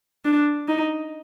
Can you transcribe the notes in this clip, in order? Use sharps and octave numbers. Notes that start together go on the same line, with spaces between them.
D4
D#4